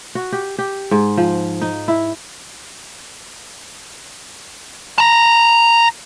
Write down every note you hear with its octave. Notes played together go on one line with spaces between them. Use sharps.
F#4
G4
G4
G#2
F3
D#4
E4
A5 A#5